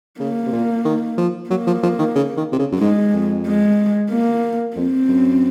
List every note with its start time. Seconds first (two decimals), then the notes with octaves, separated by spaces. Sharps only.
0.20 C#3 A#3
0.46 C3
0.53 A#2
0.85 D#3
1.18 F3
1.50 F#3 A#3
1.67 F3
1.83 F3
1.99 D#3
2.15 C#3
2.37 D#3
2.52 C3
2.59 C#3
2.72 F#2
2.80 G#2 G#3
3.13 F2
3.46 G#3
4.11 A#3
4.76 F2 C4
5.09 F#2